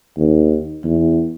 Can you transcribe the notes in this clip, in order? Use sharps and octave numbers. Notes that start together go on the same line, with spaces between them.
D#2
E2